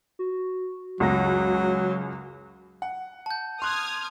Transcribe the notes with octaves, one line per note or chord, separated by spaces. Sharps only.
F#4
C#2 F#2 F#3 A#6
F#5
A5 G6
C6 D#6 F6 F#6 G#6